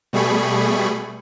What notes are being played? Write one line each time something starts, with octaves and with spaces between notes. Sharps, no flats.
B2 G3 A3 G#4 B5 C#6